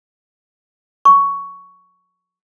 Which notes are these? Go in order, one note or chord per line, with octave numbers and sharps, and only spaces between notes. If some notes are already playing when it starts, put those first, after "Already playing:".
C#6